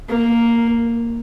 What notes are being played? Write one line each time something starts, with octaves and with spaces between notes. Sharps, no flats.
A#3